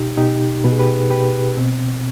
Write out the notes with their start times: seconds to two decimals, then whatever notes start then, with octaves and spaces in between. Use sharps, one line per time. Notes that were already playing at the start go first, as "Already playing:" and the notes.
Already playing: B2 D#4 G4
0.17 B2 D#4 G4
0.64 B2 B4
0.72 G#4
0.79 G4 B4
1.10 B2 G4 B4
1.57 B2 C4